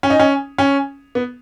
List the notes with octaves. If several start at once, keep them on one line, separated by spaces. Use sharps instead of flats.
C#4
D#4
C#4
C#4
B3